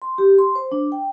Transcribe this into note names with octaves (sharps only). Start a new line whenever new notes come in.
C6
G4
C6
C5
D4
G5